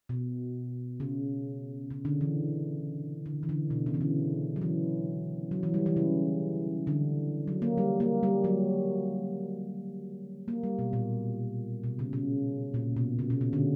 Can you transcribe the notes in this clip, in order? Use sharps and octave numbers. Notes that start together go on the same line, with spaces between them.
B2
C#3
C#3
D3
E3
D3
E3
D3
B2
C#3
E3
D3
F#3
E3
F#3
E3
G3
E3
C#3
D3
F#3
A#3
G3
A#3
G3
F#3
A#3
G3
B2
A#2
B2
C#3
C#3
A#2
B2
C#3
B2
C#3
D3